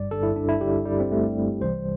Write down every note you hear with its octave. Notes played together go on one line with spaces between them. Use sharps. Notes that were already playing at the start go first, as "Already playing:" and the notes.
Already playing: G1 G2 G3 D5
G1 G2 G3 A4
E4
D4
E4
G1 G2 G3 G4
G3
C4
G1 G2 G3 A3
C2 C3 E3 G3 C5